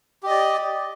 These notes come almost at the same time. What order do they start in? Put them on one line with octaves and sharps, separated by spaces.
G4 D#5 D5